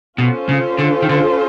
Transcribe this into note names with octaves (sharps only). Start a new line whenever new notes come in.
B2 C#4 F4 A4 C5
C#3
D3
D#3
D3